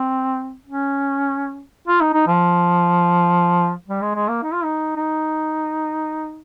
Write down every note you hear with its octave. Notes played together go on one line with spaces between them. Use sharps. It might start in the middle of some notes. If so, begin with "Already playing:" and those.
Already playing: C4
C#4
F4
D#4
D#4
F3
G3
G#3
G#3
A#3
D#4
F4
D#4
D#4